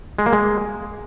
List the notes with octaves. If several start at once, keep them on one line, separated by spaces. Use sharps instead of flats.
G#3
A#3
G#3